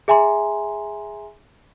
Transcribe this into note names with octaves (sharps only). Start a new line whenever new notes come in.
G#4 E5 G#5 A#5 C6